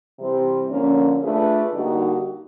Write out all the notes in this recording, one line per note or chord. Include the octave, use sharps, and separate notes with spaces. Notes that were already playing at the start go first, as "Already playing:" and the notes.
C3 E3 G3 C4
D3 F3 A#3 C#4
A3 D4 F4 G#4 B4
D3 G3 A#3 D#4 F#4